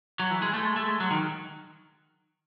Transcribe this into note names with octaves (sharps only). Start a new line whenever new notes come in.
F#3
E3
G#3
A3
G#3
A3
G#3
F#3
D#3